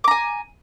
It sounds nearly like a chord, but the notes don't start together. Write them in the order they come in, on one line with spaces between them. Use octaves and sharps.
D6 A#5 G#5